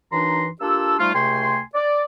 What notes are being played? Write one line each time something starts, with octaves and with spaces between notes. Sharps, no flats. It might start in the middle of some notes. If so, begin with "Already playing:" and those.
F#2 E3 D4 D#4 A#5 C6
A#3 D4 F4 G4 A4 E6
F3 G3 A3 D#4 F4
C#2 C3 A3 G5 G#5 C6
D5